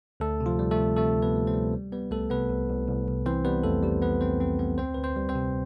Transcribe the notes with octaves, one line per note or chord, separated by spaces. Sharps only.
D2 A3 A4
C3
F3 F4
G3
A3 A4
C3
C3 A3 A4
D2
B3 B4
G3
C4 C5
G3
G3
G3 B3 B4
C2 A3 A4
C3 B3 B4
C2
C2
C2
C2
E3 C4 C5
G3 B3 B4
F2 A3 A4
G3 G4
G3 B3 B4
F2 C4 C5
F2 C4 C5
G3 B3 B4
D2 C4 C5
D2 B4
C4 C5
G3
C4 C5
C3